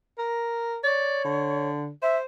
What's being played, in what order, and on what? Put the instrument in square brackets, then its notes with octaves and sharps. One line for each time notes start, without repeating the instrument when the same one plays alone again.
[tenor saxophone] A#4
[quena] C#5 [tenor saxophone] D5
[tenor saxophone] D3
[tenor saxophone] C5 [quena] E5